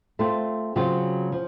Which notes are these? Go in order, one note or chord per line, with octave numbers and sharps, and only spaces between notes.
A3 C4 F4
C#3 F#3 C4 F4
F3